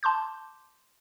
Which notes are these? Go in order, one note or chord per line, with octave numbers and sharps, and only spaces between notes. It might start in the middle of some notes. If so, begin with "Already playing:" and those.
A5 C6 D6 G6